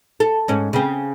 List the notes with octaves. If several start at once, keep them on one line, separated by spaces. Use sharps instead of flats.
A4
G#2 C#4
C#3 C4